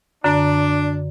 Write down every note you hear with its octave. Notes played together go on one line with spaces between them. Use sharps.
F#2 D3 D4